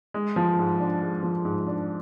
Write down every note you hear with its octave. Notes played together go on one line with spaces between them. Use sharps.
G#3
F3
G#2
D4
G#3
F3
G#2
D4